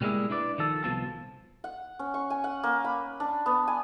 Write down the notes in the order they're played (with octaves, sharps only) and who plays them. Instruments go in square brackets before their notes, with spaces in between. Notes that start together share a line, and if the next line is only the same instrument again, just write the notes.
[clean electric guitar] B2 G3 G#3 A#3 E4 G#4
D4 E4 B4 D5
D#3 F3 A4
C2 B2 F3 A5
[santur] F#5
C#4
C#6
G#5
F#5
A#3
B5
D4
B3
G#5